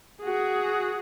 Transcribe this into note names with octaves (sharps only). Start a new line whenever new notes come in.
F#4 G#4